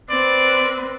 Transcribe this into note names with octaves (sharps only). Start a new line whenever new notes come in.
C4 B4 D5